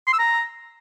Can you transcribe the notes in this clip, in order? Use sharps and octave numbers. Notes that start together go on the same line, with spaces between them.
C6
E6
A#5